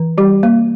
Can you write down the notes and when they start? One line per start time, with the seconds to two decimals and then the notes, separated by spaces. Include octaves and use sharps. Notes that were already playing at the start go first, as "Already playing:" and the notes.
Already playing: E3
0.18 G3 G4
0.43 A#3